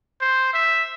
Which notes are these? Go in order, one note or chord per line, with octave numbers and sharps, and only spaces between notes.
C5
E5